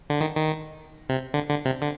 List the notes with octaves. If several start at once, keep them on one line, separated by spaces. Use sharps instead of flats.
D3
D#3
D#3
C3
D3
D3
C3
D3